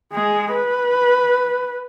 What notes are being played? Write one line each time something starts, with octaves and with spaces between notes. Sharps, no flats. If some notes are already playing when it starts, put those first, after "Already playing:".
G#3 G#4
B4